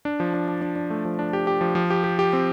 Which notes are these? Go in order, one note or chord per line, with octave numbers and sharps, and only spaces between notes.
D4
F3
D4
D4
D4
D4
A3
F3
D4
G4
G4
F3
F3
G4
G4
G4
C4